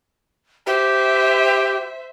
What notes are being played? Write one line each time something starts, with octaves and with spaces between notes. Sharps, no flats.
G4 C5 E5